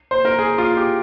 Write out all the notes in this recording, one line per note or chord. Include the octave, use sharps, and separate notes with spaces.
C5
A#4
G#4
F4
G4